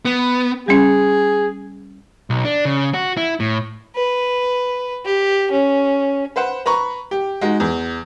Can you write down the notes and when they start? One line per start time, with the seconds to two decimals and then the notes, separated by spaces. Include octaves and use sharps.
0.05 B3
0.68 G3 C#4 G#4
2.30 B1
2.45 D4
2.65 C#3
2.94 F#4
3.17 E4
3.40 A2
3.95 B4
5.05 G4
5.51 C#4
6.36 B4 C5 F#5
6.66 B4 A#5 B5 C#6
7.11 G4
7.41 G#3 D#4 F#4
7.60 E2